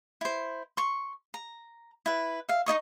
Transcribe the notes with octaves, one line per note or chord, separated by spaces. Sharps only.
E4 C5
C6 C#6
A#5
E4 B4
E5 F5
D#4 E4 D#5 C#6